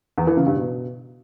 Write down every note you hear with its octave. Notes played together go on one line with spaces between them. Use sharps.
E2
E3
C#3
G2
B2